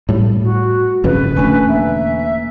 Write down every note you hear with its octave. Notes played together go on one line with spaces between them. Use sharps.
A2 G3
F#4
G1 F2 C#3 B4
E1 D3 A3 C#4 G#5
A#3 E5